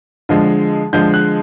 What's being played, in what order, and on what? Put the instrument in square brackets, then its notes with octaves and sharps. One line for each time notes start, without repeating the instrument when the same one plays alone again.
[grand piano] D3 F3 G#3
D3 F3 G#3 G6
F#6